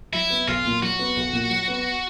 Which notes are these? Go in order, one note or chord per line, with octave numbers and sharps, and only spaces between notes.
F#3 E4
B3
B1 F4
A#2
F#3 F#4
B3
B1
A#2
F#3
B3